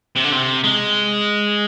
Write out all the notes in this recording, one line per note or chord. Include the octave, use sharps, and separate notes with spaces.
C3
D3
C3
G#3